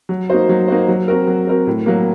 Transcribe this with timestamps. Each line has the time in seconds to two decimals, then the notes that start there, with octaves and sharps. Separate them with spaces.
0.09 F#3
0.30 A#3 D#4 F#4 C5
0.49 F#3
0.68 A#3 D#4 F#4 C5
0.88 F#3
1.08 C4 F#4 A#4
1.27 F#3
1.47 C4 F#4 A#4
1.67 A2
1.86 F#3 A#3